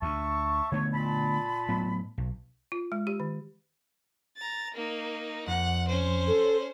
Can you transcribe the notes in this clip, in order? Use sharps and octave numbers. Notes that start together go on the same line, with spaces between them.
D2 E5 A5 C#6
D3 A3 B3 C#5
A#2 A5 B5
A2 F#3 B3
B1
F4
G#3
G4
D#3
A#5 A6
A#3 D#4
F2 F#5
C#4 C5
A4